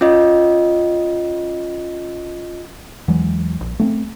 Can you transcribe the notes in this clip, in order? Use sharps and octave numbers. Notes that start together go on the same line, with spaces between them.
C#4 F4 D#5
E2 E3 F#3 G#3
A#1
A3 B3 C4